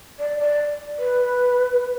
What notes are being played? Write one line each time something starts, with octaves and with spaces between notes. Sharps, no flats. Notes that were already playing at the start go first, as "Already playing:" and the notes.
D5
D5
B4